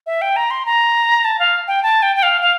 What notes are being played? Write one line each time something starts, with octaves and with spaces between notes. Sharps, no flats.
E5
G5
A#5
C6
A#5
A5
F5
G5
A5
G5
G5
F5
F5